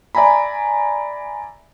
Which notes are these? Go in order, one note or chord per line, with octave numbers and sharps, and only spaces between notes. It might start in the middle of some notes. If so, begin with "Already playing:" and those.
D5 E5 G#5 A#5 B5